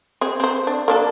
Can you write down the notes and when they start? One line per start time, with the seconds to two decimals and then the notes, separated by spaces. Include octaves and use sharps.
0.21 C4 G#4
0.40 C4 C5
0.67 D4
0.88 A#3 D4 A4